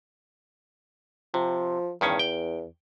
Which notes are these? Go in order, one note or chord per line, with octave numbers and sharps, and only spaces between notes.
C3 F3
E2 G2 D#3 C#4
G5